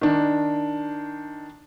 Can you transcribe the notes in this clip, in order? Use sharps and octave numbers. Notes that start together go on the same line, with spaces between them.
D#3 D4